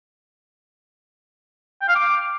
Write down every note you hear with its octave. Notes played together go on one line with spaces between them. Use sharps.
G5
F5
D6